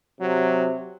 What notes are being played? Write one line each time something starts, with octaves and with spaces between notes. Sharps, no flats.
C3 F#3